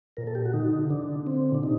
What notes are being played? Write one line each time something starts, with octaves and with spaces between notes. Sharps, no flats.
A#2 A#4
A4
G4
F#4
D3 D#4
C3
D3 D4
C4
A#2 D4
C3 D#4